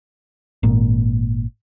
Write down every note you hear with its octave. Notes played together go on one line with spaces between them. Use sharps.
G#1 A#2